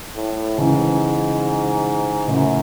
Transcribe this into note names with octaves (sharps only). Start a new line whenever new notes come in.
A2
G#2 C#3 E3
F#2 A2 C#3